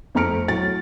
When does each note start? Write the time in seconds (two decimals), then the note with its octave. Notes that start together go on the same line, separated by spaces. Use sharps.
0.15 F2 A3 A#5 F6 C#7 D7
0.48 A2 F#3 A6